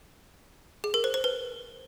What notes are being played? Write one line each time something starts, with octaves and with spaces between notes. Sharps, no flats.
G#4
A#4
C5
C5
B4